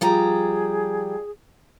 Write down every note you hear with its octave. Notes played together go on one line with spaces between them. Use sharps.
F3 G3 G#4 A#5